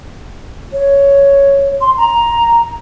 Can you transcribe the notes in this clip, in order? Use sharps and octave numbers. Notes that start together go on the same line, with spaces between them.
C#5
C6
A#5